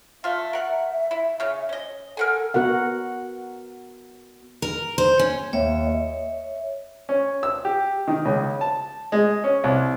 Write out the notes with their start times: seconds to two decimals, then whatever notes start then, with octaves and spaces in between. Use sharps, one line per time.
0.24 A3 F4 E5
0.53 A#4 F#5
1.11 E4
1.40 C#3 C#4
1.69 C#4 D#5
2.17 A4 A#4 F#5 G#5
2.54 B3 F#4 A#4 F#5
4.62 A#4
4.98 C5
5.19 C#4
5.53 D#2 C#5 E5
5.87 D#5
7.09 C#4
7.43 E6
7.65 G4
8.08 D#3
8.25 C#2
8.61 A5
9.12 G#3
9.44 C#4
9.64 C2